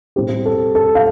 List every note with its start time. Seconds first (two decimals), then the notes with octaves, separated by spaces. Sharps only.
0.16 A2 G3 C4 E4 G4
0.46 A4
0.75 A4
0.95 F5